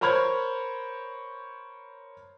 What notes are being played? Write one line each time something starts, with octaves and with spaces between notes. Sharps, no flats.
A#4 C5 C#5 B5 F6 G#6